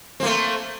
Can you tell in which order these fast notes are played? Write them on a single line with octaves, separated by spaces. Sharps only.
C4 A#3 A3